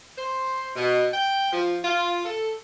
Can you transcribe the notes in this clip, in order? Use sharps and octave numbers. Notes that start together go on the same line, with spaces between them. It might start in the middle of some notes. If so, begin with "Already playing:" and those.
C5
B2
G5
F3
F4
A4